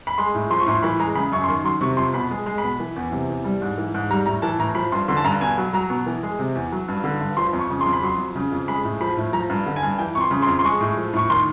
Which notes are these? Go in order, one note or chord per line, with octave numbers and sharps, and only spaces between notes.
B5
G#3 C6
A2
F3 C6
C#6
A2 C6
E3 B5
G#3 A#5
C#3 B5
F#2 C#6
C6
D#3 C#6
F#3 C6
C3 C#6
F2 C6
B2 B5
G#3
G#3
B5
B2
E3
E2
C3
E2
G3
G#2
E3
G#2
G3 A#5
A2 A#5
E3 A5
A2 A#5
F3 B5
G2 C6
D3 C6
A5
G2 A#5
B2 G#5
F#3
F#3 A#5
B2
E3
G#3
C3
E2
F#3
G2
D3
G2
F3 C6
F2
C#6
C#3
C6
F2
B5
F#3 C6
F2
C#3
F2
G#3 B5
A2
F3 B5
A2
F3 A#5
G2
D3
G#5
G2
E3 G5
F2 C#6
C6
C#3
C6
F2
C6
G#3 C#6
A2
F3
A2 C#6
D#3 C6